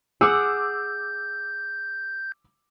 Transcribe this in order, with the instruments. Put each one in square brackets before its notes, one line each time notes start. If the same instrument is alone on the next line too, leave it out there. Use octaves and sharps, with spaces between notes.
[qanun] G#4 F#5 [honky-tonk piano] D6 E6 [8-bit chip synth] G6